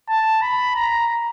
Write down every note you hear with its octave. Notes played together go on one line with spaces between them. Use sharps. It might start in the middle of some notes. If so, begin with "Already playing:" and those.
A5
B5
A#5